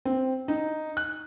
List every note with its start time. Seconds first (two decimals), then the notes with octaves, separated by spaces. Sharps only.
0.05 C4
0.48 D#4
0.97 F#6